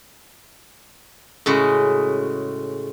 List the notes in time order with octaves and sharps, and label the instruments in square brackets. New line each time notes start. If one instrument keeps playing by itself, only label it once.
[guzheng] A2 C#3 G#3 F#4